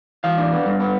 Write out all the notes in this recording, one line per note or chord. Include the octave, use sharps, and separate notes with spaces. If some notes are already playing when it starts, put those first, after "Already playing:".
E3 F5
D4
B3
G2
B3